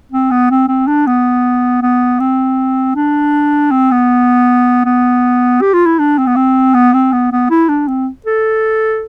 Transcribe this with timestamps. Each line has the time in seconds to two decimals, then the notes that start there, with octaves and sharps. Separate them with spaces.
0.12 C4
0.31 B3
0.50 C4
0.68 C4
0.87 D4
1.06 B3
1.82 B3
2.20 C4
2.95 D4
3.71 C4
3.91 B3
4.85 B3
5.61 G4
5.73 F4
5.86 E4
5.99 D4
6.18 C4
6.26 B3
6.36 C4
6.74 B3
6.93 C4
7.12 B3
7.32 B3
7.50 E4
7.69 D4
7.88 C4
8.26 A4